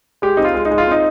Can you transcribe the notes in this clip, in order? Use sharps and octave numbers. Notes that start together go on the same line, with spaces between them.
G#3 G4
C4 D#4
F4
G#3
D#4
G#3
F4
C4 D#4